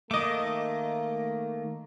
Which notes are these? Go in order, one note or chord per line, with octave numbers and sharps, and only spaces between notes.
D#3 A3 A#3 D#5 D6